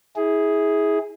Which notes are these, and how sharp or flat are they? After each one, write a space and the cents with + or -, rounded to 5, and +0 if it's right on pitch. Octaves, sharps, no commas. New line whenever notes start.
E4 -30 G#4 +0